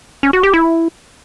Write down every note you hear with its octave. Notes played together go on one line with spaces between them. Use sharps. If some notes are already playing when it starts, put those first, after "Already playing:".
C#4
F#4
G4
E4